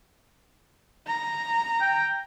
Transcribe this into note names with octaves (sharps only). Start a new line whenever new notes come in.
A#5
G5